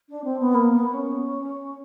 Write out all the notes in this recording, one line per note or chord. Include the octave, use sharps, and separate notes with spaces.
D4
C4
B3
A#3
B3
C#4